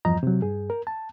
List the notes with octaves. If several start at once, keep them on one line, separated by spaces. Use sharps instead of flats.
E2 G2 F3 D#5 A#5
C3 F#3
G2 G#4
A#4
A5